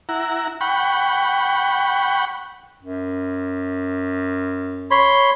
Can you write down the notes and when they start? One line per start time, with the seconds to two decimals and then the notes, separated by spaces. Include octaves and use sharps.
0.09 E4 F#5 A#5
0.61 F#5 G5 B5 C#6
2.83 F#2
4.91 C#5 B5 C6